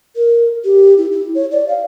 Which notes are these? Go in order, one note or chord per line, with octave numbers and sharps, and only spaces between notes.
A#4
G4
E4
E4
C#5
D5
F5